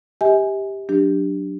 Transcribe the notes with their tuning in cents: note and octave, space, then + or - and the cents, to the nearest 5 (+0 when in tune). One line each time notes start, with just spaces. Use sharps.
G4 +5 E5 -45 G#5 +0
F#3 +0 D4 +5 G4 +0